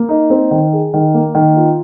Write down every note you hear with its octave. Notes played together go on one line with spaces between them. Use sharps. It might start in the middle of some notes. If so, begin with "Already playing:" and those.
Already playing: A#3
D#4
C4
D#3
G#4
D#3
A#3
D#3
F4